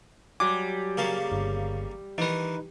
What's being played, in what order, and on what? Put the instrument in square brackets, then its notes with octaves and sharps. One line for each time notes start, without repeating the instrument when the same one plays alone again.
[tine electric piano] F#3 G#5 [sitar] G3 [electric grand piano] D6
[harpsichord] C#3 A#3 A5
[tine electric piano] G1
[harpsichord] D#3 E3 [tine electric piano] D#4 B4